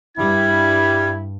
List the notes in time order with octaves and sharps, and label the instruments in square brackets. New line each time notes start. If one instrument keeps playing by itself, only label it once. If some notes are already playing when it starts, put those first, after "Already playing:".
[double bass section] G2 [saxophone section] G3 [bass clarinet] E4 [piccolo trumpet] G#6